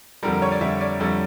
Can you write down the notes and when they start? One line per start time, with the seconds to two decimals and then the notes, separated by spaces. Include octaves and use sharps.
0.23 F2 D3 G3 A#4
0.33 A#4
0.42 C#5
0.52 D5
0.61 F2 D3 G3 E5
0.81 D5
1.00 F2 D3 G3 E5